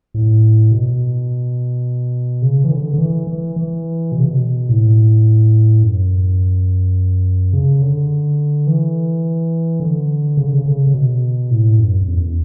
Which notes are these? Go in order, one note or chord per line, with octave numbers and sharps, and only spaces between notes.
A2
B2
C#3
E3
D3
D3
E3
E3
E3
B2
C#3
B2
A2
F#2
C#3
D3
E3
D3
C#3
D3
C#3
C#3
C#3
B2
A2
F#2
F#2
E2